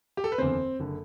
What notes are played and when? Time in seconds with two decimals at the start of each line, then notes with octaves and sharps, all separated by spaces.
0.17 G4
0.24 A4
0.32 B4
0.38 F#1 E2 D3 C4 C5
0.79 F#1 D3